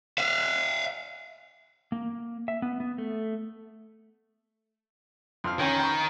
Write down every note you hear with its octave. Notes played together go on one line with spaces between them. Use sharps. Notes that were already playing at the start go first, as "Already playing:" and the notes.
E5 F5
A#3
E5
B3
B3
A3
F2 F3 F5
D#3 C#4 G5 G#5
G5 B5 C#6